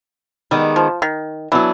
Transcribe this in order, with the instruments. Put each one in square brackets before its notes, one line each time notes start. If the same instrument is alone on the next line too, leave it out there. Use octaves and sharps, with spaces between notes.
[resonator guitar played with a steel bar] D#3 G#3 B3 [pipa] G3
[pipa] F3
D#3
[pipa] E3 [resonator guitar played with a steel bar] F#3 B3 D4